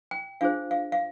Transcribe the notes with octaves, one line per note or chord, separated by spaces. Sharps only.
G5
D4 F4 G#4 C5 F5
F5
F5